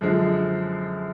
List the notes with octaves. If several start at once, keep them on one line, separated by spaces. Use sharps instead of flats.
F#2 D3 F3 G#3